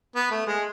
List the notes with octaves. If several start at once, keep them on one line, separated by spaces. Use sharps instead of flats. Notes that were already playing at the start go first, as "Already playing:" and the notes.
B3
A3
G#3